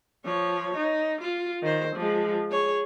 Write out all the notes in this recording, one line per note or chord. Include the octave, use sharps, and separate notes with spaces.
F3 C#5
D#4
F4
D#3 C5
F3 G#3
G#4 C#5